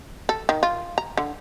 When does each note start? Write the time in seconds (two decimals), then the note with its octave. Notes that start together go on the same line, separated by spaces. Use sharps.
0.29 A4
0.49 D#3
0.63 F4
0.98 A#5
1.17 D3